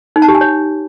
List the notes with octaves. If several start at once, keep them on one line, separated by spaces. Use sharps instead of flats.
D#4
A5
G4
G#5
C#5